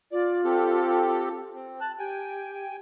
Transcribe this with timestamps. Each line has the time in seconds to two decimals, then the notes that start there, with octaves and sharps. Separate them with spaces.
0.12 F4 D5
0.44 C4 G4 A4
1.54 C4
1.81 A5 F#6
1.99 G4 G5 G#5